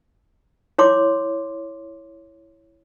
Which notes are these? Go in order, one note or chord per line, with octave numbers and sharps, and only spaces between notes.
E4 C#5 C6 D6